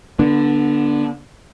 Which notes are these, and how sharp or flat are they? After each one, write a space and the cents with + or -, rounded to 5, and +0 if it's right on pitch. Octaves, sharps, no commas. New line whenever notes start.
D3 +0 B3 -30 D4 +0